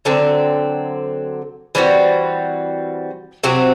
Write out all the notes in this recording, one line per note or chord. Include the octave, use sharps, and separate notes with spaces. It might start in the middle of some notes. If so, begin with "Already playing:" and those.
D3 F#3 C4
E3 G3 C4 F#4
C3 F#3 C4 F#4